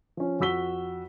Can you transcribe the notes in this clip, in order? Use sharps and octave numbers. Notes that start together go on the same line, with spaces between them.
F3 C#4
F2 F#4 E6 B6 G7